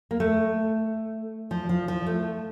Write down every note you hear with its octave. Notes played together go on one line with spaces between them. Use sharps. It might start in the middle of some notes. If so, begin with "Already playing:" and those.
A#3
A3
F3
F3
F3
A3